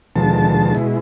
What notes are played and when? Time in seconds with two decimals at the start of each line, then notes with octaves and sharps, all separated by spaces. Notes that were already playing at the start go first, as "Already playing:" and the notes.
0.16 D#2 B2 D3 F3 G#3 A5
0.75 B2 G#3 E4